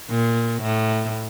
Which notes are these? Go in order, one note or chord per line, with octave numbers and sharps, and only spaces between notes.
A#2
A2